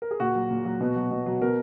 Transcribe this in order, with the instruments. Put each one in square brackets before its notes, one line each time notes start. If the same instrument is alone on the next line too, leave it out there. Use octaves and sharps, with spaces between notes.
[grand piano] A#4
G#4
A#2 F#4
F#3
A#2
F#3
B2
F#3
B2
F#3
B2 A#4